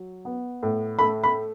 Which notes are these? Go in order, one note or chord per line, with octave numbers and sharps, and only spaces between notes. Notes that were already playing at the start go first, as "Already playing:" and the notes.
Already playing: F#3
B3
A2
A3 B5
B5